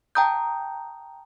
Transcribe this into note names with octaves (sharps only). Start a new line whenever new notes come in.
G5 A5 A#5 D#6 G6